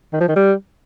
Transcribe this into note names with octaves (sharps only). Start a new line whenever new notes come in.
D#3
F3
D#3
G3